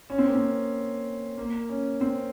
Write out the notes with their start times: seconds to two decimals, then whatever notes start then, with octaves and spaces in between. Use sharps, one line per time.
0.10 C#4
0.18 C4
0.27 A#3
0.35 C4
1.38 A#3
1.69 C#4
2.01 C4